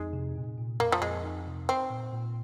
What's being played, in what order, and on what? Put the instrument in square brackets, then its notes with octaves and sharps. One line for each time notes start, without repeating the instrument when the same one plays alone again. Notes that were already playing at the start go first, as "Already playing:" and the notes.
Already playing: [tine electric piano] F2 D#4 [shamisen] G#3
[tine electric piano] C3
A#2
A#2
[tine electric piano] F2 [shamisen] A#3
[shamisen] F3
[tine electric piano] F2 [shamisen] G#3
[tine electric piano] D#4
C3
[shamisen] C4 [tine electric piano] C5
[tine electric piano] A#2
A#2